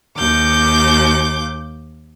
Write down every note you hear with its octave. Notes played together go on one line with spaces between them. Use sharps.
D#2 D6 G6